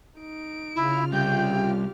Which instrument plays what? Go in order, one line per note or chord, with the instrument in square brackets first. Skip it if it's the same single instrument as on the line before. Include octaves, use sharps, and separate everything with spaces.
[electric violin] D#4 D7
[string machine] C#3 F4 F6 [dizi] E4
[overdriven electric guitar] C2 [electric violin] G4 G6 [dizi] G5
[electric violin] G4